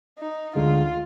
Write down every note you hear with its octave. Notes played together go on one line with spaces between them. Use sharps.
D#4
D2 D3 G#3 D#4 F4